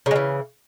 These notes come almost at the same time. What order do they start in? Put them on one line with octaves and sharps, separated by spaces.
C#3 G#3 E3